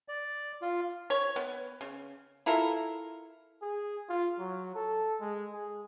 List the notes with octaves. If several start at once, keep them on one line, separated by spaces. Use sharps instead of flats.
D5
F4
C#5
B3
C#3
E4 F4 A4 A#4
G#4
F4
F#3
A4
G#3
G#4